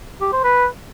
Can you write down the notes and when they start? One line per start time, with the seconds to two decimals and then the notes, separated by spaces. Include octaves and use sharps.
0.21 G4
0.32 C5
0.44 B4